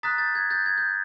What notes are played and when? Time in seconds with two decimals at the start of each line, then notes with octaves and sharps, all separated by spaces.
0.03 A#5 D#6 F#6 A6 B6
0.18 G6 A6
0.35 G#6
0.50 G6 A6
0.66 G#6
0.78 G6